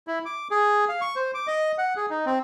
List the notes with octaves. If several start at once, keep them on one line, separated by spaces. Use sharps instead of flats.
E4
D6
G#4
F5
C#6
C5
D6
D#5
F#5
G#4
D#4
C4